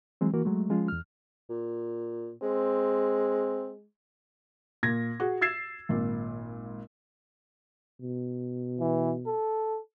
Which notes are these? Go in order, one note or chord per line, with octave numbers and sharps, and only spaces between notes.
E3 F#3 G#3 C4
E3 A#3 F#4 A#4
F#3 G#3 A3
F3 G#3 C#4 F4
E2 F6
A#2
G#3 C4
A#2 G#6 A#6
F#4 G#4
E6 G#6 A6 C7 E7
G#1 A#2
B2
E3
A4